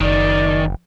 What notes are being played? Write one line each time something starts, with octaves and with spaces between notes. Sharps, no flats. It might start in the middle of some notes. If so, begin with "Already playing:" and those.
F#1 D#3 D5